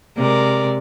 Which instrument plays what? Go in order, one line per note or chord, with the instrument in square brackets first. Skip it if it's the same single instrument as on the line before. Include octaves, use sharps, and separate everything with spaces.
[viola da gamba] C3 G#3 [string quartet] A#4 D5